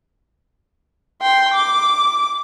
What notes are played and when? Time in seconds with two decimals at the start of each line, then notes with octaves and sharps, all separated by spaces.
1.22 G5 C6
1.54 D6